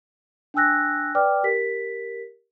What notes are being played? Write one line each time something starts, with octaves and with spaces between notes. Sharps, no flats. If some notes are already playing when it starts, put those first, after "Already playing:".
D4 G5 G#5 E6 F#6 A#6
B4 D5 G5 D6 F6
G4 A#4 B6